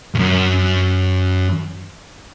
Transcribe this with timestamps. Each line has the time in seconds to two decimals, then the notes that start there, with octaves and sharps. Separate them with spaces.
0.15 C2 F#2